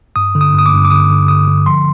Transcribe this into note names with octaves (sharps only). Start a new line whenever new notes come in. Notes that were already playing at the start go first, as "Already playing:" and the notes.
G2 D#6
D3
D#6
G2 D#6
D6
G2
D6
D3 D#6
D3
D3 D#6
D3
F3 C6